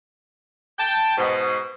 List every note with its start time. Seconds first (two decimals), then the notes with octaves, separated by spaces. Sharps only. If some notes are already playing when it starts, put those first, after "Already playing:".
0.78 G5 A5
1.18 G#2 B2